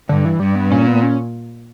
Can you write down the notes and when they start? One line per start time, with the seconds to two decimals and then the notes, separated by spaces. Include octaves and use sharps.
0.09 G2 D3
0.25 E3
0.40 G2 G3
0.55 B3
0.71 A#2 C#4
0.87 B3
1.03 C#4